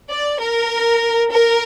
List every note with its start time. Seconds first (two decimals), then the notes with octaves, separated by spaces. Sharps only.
0.10 D5
0.40 A#4
1.30 A#4